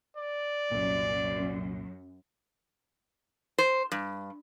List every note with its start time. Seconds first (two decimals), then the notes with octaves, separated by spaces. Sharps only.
0.17 D5
0.71 C2 F#2 A#2
3.58 C5
3.92 G2